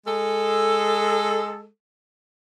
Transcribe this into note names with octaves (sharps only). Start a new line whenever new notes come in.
G#3 A4